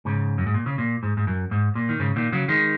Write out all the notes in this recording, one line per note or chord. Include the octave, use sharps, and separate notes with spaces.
G#2 C#3
F#2
G#2
A#2
C#3
A#2
G#2
G#2
F#2
G#2
A#2
D#3
G#2 C#3
A#2 D#3
C#3 F#3
D#3 G#3